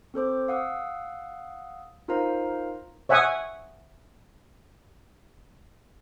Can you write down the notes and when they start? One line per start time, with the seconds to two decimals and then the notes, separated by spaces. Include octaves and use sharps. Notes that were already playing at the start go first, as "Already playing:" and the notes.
0.14 C4 A4 C5 D6
0.48 F5 F#5 D#6 E6
2.08 D#4 F4 A#4 C5 F5 A#5
3.09 C#5 E5 F#5 G#5 C#6 D#6